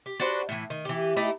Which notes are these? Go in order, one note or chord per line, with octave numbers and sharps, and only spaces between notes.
G4
D4 F#4 B4 C5
A2 E3
D#3
E3 G4
A3 D#4 E4 G4